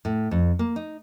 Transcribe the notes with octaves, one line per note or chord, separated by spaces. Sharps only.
A2
F2
A#3
D#4